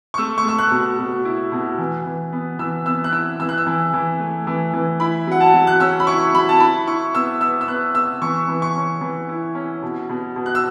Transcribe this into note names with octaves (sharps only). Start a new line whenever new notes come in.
C#6
A3 E6
C#6
A3 E6
F#6
B2
B2
E4
B2
E3
E3
B3
E3 E6
B3 E6
F#6
E4 E6
E3 E6
F#6
E6
E3
E3
A3
E3
E3
E4 B5
F#3 F#5
A5
F#3
F#6
C#4 E6
B5
E4 C#6
F#3 B5
A5
E4 B5
E4 C#6
B3 E6
B3 E6
E6
B3 F#6
B3 E6
E3 C#6
E3
C#6
C#4
E3
E4
C#4
B2
B2
B2
F#6
E6